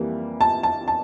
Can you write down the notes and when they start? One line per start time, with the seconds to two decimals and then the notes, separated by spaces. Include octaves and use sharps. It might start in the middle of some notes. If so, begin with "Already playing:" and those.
Already playing: F2 E3 G3 A#3
0.41 A5
0.63 A5
0.88 A5